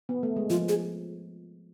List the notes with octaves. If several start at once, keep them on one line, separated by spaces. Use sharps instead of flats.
B3
A3
G#3
F3 F4
G#4